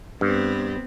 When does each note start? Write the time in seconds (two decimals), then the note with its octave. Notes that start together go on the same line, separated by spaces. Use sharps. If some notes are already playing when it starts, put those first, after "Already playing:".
0.21 G2 B3 C4